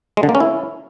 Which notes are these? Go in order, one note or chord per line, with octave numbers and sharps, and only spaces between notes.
G#3
D3
A#3
C#4
E4